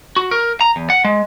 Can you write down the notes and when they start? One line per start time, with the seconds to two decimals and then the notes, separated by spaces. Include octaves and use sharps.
0.16 F#4
0.31 A#4
0.61 A#5
0.76 E2
0.90 F#5
1.05 G#3